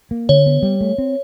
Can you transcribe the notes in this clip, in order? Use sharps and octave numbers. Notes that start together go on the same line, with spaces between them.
A#3
D3 C#5
B3
G3
A3
C4